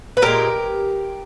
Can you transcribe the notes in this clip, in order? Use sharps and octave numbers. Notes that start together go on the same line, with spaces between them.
B4
A#2 G#3 G4 A#4